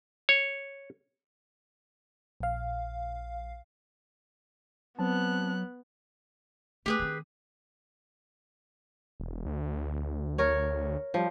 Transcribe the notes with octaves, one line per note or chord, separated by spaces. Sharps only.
C#5
A#1 F5
F#3 B3 C4 A5 F#6
A3 G4 G#4 B4
D#3 C4
E1
D2
A#4 C#5
F3 G3